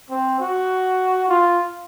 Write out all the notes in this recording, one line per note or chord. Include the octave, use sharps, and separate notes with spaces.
C4
F#4
F4